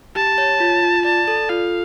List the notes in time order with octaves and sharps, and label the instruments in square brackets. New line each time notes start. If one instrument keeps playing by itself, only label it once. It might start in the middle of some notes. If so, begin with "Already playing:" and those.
[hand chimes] G4 [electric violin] A5
[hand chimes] C#5
F4
F4
[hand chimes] D5 [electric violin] A5
[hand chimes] A4
[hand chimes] F4 [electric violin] F5